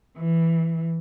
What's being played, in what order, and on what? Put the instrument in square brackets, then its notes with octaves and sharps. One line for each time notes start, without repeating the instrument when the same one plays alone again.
[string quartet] E3